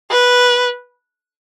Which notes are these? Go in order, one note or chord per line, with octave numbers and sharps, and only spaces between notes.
B4